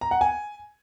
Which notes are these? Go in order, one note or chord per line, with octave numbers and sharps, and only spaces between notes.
A#5
F#5
G#5